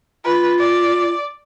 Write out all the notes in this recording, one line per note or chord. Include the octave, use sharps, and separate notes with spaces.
F4 B4
D5